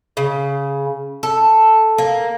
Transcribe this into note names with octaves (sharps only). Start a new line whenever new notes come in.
C#3
A4
A#3